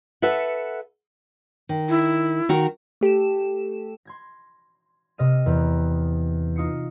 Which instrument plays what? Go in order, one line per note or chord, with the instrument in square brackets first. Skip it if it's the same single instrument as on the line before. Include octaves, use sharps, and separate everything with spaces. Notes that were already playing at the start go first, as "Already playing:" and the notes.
[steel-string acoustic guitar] A4 B4 E5 F#5
[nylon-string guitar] D#3
[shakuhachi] E4
[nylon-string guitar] D#3 F#4 A#4
[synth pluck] A3 G4 A4 E7
[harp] C6 G#6 A#6
C3 D#5 F6 D#7
E2 A#5 F#6
D#4 F4 D#6 C7 C#7